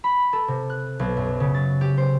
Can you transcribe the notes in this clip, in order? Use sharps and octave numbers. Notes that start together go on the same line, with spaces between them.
B5
A4
C3
F#6
B1
F#2
C#3
A6
G4
C5